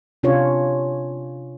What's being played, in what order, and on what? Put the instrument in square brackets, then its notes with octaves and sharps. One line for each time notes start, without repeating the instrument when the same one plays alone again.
[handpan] C3 C#4 D4 F4 C#5